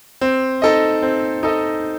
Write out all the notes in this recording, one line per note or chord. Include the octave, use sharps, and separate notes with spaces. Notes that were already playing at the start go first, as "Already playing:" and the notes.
C4
D#4 A4 D#5
C4
D#4 A4 D#5